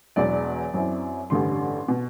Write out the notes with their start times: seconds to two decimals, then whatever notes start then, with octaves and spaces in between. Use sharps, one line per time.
0.16 E1 E2 B2 F#3 D5
0.74 F#2 F#3 C4 E4
1.30 A1 G2 D3 G3 C6
1.88 B2